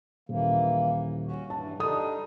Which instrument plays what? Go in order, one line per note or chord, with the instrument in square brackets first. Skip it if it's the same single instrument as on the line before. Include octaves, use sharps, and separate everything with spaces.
[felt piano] D#1 [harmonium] E3 A#3
[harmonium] C#4 F#4
[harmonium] G2 E3 [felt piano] A5
[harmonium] G3 D4 D#4 [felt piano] A4 D#6